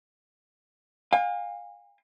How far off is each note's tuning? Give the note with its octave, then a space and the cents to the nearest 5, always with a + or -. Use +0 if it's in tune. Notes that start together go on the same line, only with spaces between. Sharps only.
F5 +25 G#5 -40